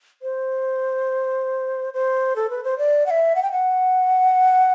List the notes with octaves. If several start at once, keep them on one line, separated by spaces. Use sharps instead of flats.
C5
C5
A4
B4
C5
D5
F#5
E5
F#5
G5
F#5